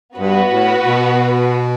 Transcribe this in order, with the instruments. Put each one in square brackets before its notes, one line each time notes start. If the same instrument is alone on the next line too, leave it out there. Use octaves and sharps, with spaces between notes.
[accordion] G2 [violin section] B3 F#4 B4
[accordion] A2
B2